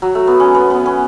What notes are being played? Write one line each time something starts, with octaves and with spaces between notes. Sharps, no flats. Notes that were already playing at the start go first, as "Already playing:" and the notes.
F#3
A3
B3
C#4
B3
B3
C#4